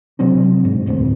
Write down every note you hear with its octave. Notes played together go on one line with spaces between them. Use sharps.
C3 F#3 C4 D4
G#2
F1 D2 A2 C4